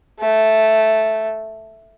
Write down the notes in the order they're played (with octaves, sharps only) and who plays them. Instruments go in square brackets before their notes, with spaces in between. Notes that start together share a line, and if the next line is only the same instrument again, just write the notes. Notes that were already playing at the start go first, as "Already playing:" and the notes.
[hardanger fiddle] A3